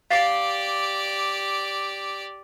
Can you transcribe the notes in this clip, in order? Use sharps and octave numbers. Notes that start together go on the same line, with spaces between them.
G4 D5 F5 A6 C7